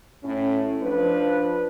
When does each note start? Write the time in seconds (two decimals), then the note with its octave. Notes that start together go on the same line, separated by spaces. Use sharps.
0.23 A2 C#4
0.82 F3 D4 B4